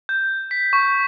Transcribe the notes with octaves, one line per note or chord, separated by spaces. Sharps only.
G6
B6
C#6